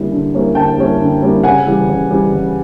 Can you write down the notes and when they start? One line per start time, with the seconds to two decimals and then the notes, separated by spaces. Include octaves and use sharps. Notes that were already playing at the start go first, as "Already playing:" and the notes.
Already playing: D3 G3 A#3 C#4 E4
0.12 D3
0.34 G3 A#3 C#4 E4
0.55 D3 G5 A5
0.78 G3 A#3 C#4 E4
1.00 D3
1.22 G3 A#3 C#4 E4
1.43 C#3 F#5 G#5
1.67 E3 G3
1.89 C#3
2.10 E3 G3
2.33 C#3